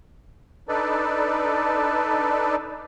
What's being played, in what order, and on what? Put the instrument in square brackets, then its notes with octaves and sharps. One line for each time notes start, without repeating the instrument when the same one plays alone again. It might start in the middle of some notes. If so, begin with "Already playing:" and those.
[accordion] D4 D#4 A4 B4 D5